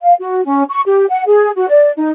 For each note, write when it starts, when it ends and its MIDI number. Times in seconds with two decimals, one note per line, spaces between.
0.03 0.14 77
0.19 0.43 66
0.45 0.64 61
0.70 0.81 85
0.86 1.05 67
1.09 1.23 78
1.27 1.51 68
1.56 1.68 66
1.69 1.91 74
1.96 2.11 63